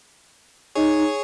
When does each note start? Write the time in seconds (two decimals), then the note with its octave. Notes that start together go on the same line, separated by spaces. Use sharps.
0.75 D#4 G#4 C#5